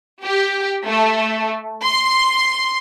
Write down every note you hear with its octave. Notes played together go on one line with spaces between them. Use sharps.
G4
A3
C6